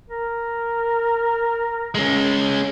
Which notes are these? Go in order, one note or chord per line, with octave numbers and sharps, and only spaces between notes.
A#4
G#3 C#4